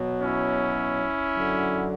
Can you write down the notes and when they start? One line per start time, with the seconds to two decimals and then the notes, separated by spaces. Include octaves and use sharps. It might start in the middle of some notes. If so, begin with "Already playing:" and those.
Already playing: B2 F#3
0.21 C#4 E4
1.33 F#2 D3 F#3